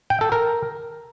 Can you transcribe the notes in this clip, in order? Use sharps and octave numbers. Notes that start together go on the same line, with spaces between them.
G5
A4
A#4